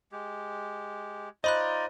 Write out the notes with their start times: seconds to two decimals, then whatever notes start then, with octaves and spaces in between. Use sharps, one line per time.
0.12 G#3 G4
1.44 D#4 F4 C5 D5 D#5 B5 F#6